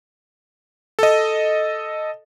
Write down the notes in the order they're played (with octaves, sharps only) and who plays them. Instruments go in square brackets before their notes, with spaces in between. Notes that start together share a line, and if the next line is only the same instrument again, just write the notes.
[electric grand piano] A4 D#5